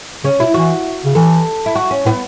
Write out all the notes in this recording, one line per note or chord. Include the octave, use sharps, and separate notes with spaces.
C#3 C#4
B2 E4
E3 F#4
C#3
E3 A4
E4
F#4
C#4
A2 B3